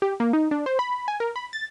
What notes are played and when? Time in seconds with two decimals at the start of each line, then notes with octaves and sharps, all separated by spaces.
0.02 G4
0.20 A#3
0.33 D#4
0.51 D4
0.66 C5
0.79 B5
1.08 G#5
1.20 A#4
1.36 B5
1.53 A6